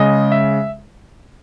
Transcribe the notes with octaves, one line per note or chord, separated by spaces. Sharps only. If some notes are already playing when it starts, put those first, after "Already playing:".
Already playing: C#3 G#3 D#5
E5